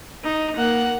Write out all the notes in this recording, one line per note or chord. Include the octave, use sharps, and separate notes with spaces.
D#4
A#3 F#5